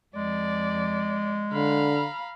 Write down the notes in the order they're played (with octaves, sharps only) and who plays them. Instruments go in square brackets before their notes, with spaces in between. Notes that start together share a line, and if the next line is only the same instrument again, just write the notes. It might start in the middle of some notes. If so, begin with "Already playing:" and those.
[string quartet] F2 D5 [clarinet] G#3
[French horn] D3 [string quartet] F5 A#5 B5